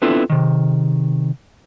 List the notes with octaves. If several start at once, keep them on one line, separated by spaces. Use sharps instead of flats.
B3 C4 D4 E4 F4 A4
C3 D#3